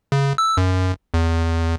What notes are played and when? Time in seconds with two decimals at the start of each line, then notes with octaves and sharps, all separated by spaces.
0.12 C#3
0.38 E6
0.57 F#2
1.14 E2